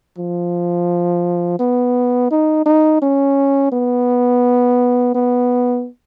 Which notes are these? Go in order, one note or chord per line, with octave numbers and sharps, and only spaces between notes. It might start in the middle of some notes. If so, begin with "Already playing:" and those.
F3
B3
D#4
D#4
C#4
B3
B3